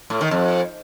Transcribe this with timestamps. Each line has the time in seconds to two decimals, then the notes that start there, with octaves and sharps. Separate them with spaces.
0.10 A2
0.21 D#3
0.31 F2